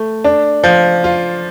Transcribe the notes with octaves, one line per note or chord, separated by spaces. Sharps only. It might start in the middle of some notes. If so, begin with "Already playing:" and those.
Already playing: A3
D4
F3
F4